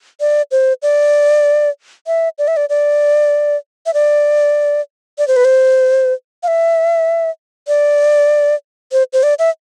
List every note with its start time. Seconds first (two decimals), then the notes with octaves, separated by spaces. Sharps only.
0.20 D5
0.51 C5
0.82 D5
2.07 E5
2.38 D5
2.48 E5
2.57 D5
2.69 D5
3.86 E5
3.94 D5
5.18 D5
5.28 C5
5.36 B4
5.45 C5
6.43 F5
6.48 E5
7.68 D5
8.92 C5
9.13 C5
9.23 D5
9.39 E5